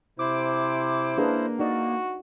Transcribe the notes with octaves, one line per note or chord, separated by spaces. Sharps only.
C3 E4 C5 D6
A#3 D4 G#4 B4
D#4 F#4 D5 D#5